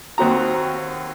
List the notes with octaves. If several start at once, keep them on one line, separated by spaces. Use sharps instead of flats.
D#2 C4 F#4 A#5